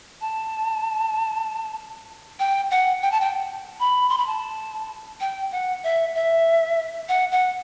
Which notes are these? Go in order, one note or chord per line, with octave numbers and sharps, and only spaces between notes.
A5
G5
F#5
G5
A5
G5
B5
C6
B5
A5
G5
F#5
E5
E5
F#5
F#5